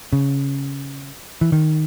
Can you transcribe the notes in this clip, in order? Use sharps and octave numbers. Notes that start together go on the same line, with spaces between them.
C#3
E3
D#3